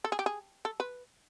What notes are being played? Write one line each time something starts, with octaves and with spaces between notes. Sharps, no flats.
A4
G#4
G4
G#4
A4
B4